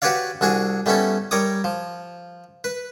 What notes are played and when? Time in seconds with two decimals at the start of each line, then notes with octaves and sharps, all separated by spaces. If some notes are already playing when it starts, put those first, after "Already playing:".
0.02 F#4 G4 B4 C#5 D5 F5
0.41 C2 D4 F#4 G#4 G#5
0.86 G3 A3 B3 C#4 E4 A4
1.31 G3 A#4 C#5 D6 D#6
1.64 F3
2.64 B4